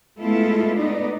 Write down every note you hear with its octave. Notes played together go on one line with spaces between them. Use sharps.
G#3 A3 B3 E4 F4 A4
B3 D#4 D5